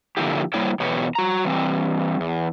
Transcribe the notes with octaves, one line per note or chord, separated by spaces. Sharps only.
D3 F3 A#3 E4 G4
G3 A#3 E4 C5 C#5 G5
E2 B2 B3 G4 C#5
F#4 A#5
E3 G3 C4
E2